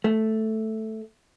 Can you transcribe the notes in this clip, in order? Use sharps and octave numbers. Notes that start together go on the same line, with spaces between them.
A3